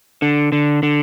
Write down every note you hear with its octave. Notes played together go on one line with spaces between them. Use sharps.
D3
D3
D3